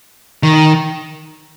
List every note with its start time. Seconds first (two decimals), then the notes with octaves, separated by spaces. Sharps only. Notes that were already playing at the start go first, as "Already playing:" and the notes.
0.43 D#3